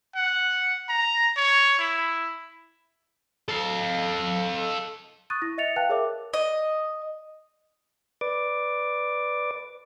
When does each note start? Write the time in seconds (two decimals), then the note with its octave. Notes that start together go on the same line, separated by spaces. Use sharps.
0.15 F#5
0.89 A#5
1.37 C#5
1.79 E4
3.48 A4 F5
5.30 C#6 D#6 F#6 A6 D#7
5.42 E4 A#6
5.58 D#5 E5 A6 C#7 F7
5.76 B4 F5 G5 A5 F#6
5.89 G#4 A#4 C#5 E5 D6
6.34 D#5
8.21 B4 D5 D6